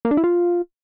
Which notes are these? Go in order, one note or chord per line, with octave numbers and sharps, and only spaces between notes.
A#3
D4
E4
F4